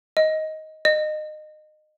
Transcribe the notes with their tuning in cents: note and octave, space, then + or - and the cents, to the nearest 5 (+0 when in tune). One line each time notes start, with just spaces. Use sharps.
D#5 +10
D#5 -25